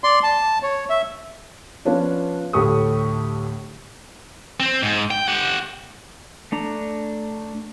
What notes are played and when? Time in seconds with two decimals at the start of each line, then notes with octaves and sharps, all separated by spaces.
0.04 D5 C6
0.23 A5
0.63 C#5
0.90 E5
1.85 F3 B3 C#4 D4 F4 B4
2.53 D2 A2 G4 A4 C#6 D#6
4.60 C4
4.83 G#2
5.11 G5
5.28 G4 F#5
6.52 A3 D4 A#5